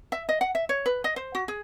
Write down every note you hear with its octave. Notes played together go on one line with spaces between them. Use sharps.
E5
D#5
F#5
E5
C#5
B4
D#5
C5
F#4
G#4